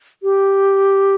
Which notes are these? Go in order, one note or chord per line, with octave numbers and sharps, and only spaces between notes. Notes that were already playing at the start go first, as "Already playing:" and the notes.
G4